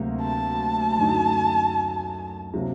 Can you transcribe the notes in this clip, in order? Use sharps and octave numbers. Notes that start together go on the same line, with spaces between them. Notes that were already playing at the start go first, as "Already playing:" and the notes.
Already playing: D2 C3 F#3 A#3
A5
F#2 D3 A3 D#4 F#4
C3 F#3 A#3